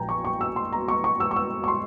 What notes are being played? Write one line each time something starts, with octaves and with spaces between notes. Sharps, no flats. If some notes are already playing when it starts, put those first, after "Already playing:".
Already playing: A#1 A#2 F3 G5 G#5 A#5
C#6
C#6
E6
C6
A#5
C#6
C#6
E6
C#6
E6
C#6
C6